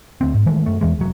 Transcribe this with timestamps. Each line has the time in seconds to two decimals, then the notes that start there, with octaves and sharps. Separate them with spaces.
0.21 D2 C4
0.34 G#2
0.46 D#3 E3 G#3 A3
0.66 F#2 A3
0.81 E2 E3 G#3
0.99 F1 F#3